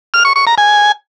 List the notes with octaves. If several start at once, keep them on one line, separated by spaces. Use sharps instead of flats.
F6
C#6
C#6
A#5
G#5